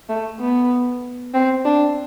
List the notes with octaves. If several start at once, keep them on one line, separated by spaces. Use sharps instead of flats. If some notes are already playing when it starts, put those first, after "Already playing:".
A3
B3
C4
D4